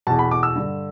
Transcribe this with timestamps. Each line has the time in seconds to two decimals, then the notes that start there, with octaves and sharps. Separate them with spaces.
0.07 E2 B2 A5
0.19 B5
0.31 D6
0.43 E6
0.56 G2 D3